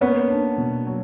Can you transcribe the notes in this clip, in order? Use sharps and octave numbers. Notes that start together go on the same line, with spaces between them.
A#3 B3 C#4
D4
B2
F#3